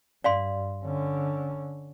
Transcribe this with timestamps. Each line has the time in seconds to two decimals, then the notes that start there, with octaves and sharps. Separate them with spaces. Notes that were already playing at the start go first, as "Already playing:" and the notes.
0.24 G2 D5 F5 C6
0.85 D3 C#4